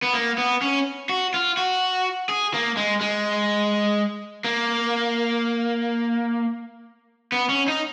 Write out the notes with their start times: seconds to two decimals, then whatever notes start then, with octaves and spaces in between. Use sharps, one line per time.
0.02 B3
0.14 A#3
0.38 B3
0.62 C#4
1.09 F#4
1.34 F4
1.57 F#4
2.29 G#4
2.54 A#3
2.77 G#3
3.01 G#3
4.44 A#3
7.32 B3
7.49 C#4
7.68 D#4